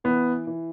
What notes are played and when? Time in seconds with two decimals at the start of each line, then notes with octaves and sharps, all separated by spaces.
0.04 E3 B3
0.47 E3